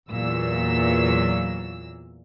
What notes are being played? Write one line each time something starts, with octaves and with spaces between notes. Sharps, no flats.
E2 A#2 F#3 E6